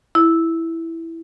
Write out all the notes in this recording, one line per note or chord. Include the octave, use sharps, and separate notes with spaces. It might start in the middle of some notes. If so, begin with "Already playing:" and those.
E4